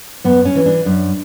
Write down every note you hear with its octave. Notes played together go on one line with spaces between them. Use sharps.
F#2 B3
C#4
E3
D4
F#2